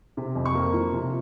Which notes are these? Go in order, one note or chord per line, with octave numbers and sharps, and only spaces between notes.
C3
F2
C#6
A#3
F3
C3